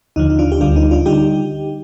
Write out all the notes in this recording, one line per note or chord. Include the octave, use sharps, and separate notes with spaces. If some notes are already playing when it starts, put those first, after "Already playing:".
D#2 D3 F3 D#4
D#4
D4 F4
G4
D2 D3 G3 D4 F4
D#4
D4 F4
D3 G3 D#4 G4